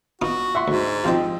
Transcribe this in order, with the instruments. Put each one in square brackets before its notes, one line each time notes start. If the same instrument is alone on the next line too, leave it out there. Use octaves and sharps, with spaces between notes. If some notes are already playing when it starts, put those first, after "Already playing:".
[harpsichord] B3 D#4 F4 [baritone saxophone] F#4
[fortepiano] E5 F#5 C6
[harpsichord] D2 [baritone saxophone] G#2
[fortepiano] F3 C4 D#4 [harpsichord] G4 F5